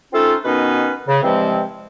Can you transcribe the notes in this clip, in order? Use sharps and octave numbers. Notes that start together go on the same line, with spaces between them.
A3 C4 C#4 D#4 F4 A4
B2 D#3 B3 C#4 D#4 B4
C#3
G2 E3 F3 G#3 C4